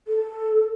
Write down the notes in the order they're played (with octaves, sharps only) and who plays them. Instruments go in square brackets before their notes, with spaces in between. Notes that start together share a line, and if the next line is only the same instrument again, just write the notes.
[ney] A4